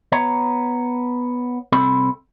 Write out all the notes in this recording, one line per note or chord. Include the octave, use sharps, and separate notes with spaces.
B3 C#5 A#5
C2 C4 A4 B5